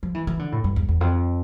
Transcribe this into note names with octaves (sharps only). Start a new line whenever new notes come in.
F3
E3
E3
D3
A2
G2
E2
E2
F2